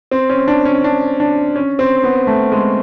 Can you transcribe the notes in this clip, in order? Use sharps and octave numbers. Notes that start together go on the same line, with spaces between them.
C4
C#4
D4
C#4
D4
D4
C#4
C4
B3
A3
G#3